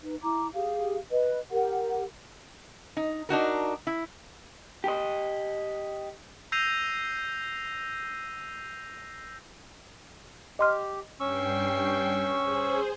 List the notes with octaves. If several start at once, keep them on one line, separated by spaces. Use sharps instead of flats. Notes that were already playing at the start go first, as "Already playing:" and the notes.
D#4 B4
E4 A#5 D6
G4 G#4 F5
B4 D#5
G4 A#4 F#5
D#4
D4 D#4 F#4 A#4
E4
G4 D#5
E6 G6 A#6 C7 D#7 F7
G4 D#5 C6 F6
G2 C#4 G5 C#6 E6 C7
G#4 C5